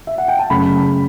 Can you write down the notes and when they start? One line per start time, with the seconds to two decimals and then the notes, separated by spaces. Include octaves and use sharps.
0.07 E5
0.18 F#5
0.28 G5
0.39 A5
0.50 F#2 C#3 F#3 A3 B5